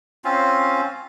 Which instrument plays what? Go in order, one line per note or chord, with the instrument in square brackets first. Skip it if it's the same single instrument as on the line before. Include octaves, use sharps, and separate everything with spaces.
[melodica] C4 C#4 F4